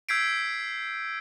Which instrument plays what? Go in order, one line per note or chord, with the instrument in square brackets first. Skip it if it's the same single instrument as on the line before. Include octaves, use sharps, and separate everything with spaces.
[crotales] E6 G6 G#6 B6 C7 D7